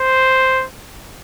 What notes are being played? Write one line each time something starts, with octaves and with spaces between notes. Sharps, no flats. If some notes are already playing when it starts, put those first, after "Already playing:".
Already playing: C5